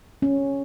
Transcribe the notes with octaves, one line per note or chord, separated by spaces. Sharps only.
C#4